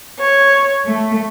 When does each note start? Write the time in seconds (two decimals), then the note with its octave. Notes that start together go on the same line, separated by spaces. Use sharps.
0.19 C#5
0.85 A3